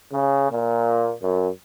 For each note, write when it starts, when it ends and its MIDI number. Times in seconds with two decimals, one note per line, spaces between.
0.12 0.47 49
0.50 1.12 46
1.22 1.48 42